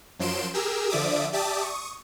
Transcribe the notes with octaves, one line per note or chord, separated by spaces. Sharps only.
F#2 F3 F#3 C6 D7 E7
G4 G#4 A#4 E6
D3 F3 D5 E5 D6 D#6
G4 D5 E5 A5 D6 D#6
C#6 D#6